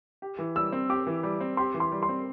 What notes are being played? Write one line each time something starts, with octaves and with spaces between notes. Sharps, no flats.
G4
E3
G3 E6
C4
G4 D6
E3
G3
C4
G4 C6
E3
C6
G3
C6
C4